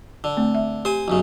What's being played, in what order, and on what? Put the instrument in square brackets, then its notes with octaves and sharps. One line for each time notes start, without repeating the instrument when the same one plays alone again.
[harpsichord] D3
[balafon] A3 C4
E5
[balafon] G4 [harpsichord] C5 G#5
[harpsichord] B1 F#2 C#3